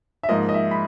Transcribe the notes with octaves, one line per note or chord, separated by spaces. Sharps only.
E5
G#2 F3 A#3 D#5
D#5
E5
B5